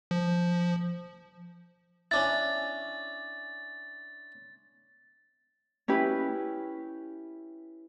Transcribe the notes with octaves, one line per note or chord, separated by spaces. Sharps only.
F3
C#4 D4 E4 A6
C#4 E4 G4 B4